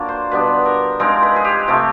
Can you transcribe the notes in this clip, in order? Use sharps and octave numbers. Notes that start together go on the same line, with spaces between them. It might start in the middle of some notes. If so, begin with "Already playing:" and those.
Already playing: F#3 A#3 D4 F4
C5
B2 G3 B3 D4 B4
A#4
F3 G#3 C4 D#4 A#4
B4
G#4
G4
C3 F3 A3